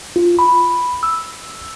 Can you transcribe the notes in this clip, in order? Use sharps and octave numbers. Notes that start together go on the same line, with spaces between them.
F4
B5
E6